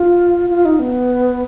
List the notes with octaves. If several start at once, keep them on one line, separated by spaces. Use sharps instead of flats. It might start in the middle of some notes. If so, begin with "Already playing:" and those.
Already playing: F4
F4
D#4
B3